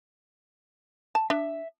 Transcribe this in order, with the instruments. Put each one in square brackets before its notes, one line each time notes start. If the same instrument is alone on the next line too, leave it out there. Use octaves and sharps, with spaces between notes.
[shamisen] A5
[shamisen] D4 [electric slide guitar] E5